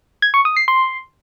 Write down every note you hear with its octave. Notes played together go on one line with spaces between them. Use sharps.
G#6
C#6
D#6
C7
C6